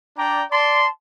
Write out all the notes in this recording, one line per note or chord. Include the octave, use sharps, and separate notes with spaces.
D4 D5 G5 A#5
D5 A5 C6